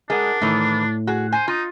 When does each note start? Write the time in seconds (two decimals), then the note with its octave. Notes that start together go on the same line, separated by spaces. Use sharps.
0.10 G#3 D4 G#4 A#4 F#5
0.42 A2 D#3 E3 A3
1.07 F#4 G#4
1.32 C5 G#5
1.48 D#4 F4